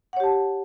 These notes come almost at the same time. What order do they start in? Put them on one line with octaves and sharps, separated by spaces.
F#5 C#5 G4 A5